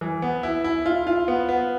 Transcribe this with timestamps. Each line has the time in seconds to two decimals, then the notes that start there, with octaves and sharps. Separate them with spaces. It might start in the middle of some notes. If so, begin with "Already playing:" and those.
0.01 E3
0.22 B3
0.43 E4
0.64 E4
0.86 F4
1.07 F4
1.28 B3
1.49 B3